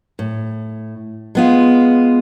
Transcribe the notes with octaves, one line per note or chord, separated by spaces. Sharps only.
A2
G#3 B3 F4